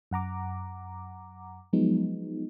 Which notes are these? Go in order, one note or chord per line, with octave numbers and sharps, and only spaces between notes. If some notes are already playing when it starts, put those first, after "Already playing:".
F#2 F#5 A#5 D6
F3 F#3 G#3 B3 D#4